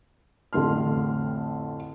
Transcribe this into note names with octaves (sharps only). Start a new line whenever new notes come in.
A1 F2 D3 A3 C6 F6